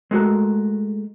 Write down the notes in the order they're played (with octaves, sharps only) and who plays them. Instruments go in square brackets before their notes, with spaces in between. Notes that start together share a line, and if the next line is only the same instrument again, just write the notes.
[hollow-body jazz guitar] G#3 A3 F#4 A#4